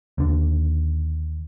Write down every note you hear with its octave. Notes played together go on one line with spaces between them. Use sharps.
D#2 D3